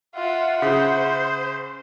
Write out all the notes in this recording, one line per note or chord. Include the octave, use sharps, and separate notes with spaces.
F4 E5 F#5
C#3 C5